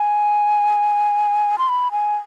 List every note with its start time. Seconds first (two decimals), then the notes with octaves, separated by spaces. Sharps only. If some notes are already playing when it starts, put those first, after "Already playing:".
Already playing: G#5
1.58 C6
1.69 B5
1.92 G#5